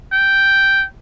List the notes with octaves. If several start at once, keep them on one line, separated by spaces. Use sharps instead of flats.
G5